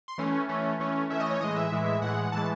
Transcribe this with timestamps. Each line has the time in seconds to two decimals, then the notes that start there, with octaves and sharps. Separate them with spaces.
0.08 C6
0.18 E3 A3 C#4
0.49 E3 A3 C#4
0.80 E3 A3 C#4
1.10 E3 A3 C#4 E5
1.20 D#5
1.31 C#5
1.40 A2 E3 G#3 D#5
1.56 E5
1.72 A2 E3 G#3
2.02 A2 E3 G#3 F#5
2.32 A2 E3 G#3 A5